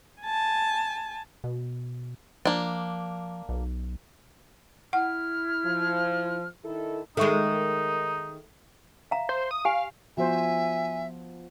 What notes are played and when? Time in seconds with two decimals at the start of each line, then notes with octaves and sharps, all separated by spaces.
0.23 G#5 A5
1.44 B2
2.45 F3 A#3 D4
3.49 B1
4.93 E4 F#5 F6
5.65 F3
6.64 D#3 E4 A4
7.17 D#3 G#3 D#4 A4 E5 C#6
9.11 E5 F5 A#5
9.29 C5
9.51 D#6
9.65 G4 F5 G#5
10.17 F3 B3 F#4 C5 E5 G#5